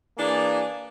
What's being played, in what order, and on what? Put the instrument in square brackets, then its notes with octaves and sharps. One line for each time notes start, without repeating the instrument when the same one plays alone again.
[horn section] E3 A#3 D4 G#4 D5